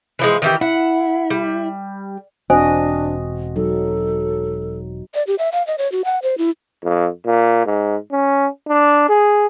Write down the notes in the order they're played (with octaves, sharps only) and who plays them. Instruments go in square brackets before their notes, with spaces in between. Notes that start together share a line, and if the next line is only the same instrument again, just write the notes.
[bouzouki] E3 F3 G#3
D#3 E3 G4
[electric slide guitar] E4 [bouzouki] F#5
[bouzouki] G3
[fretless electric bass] E1 [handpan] C4 F#4 D#5 [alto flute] D4 [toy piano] C5 G#5
[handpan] F#3 D#4 [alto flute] A4
[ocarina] D5
G4
E5
F5
D#5
C#5
F#4
F#5
C5
E4
[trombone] F2
A#2
G#2
C#4
D4
G#4